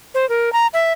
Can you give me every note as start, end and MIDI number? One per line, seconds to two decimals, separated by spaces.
0.14 0.28 72
0.29 0.52 70
0.53 0.67 82
0.73 0.93 76